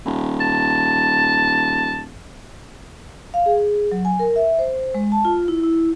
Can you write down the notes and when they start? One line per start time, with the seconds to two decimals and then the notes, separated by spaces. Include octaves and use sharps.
0.06 D#1
0.40 A5
3.34 F5
3.46 G#4
3.92 F#3
4.05 G#5
4.19 A#4
4.36 E5
4.59 C5
4.94 G#3
5.12 A5
5.25 F4
5.48 E4
5.64 E4